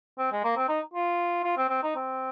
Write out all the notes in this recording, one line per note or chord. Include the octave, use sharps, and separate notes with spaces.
C4
G#3
A#3
C4
D#4
F4
F4
C4
C4
D#4
C4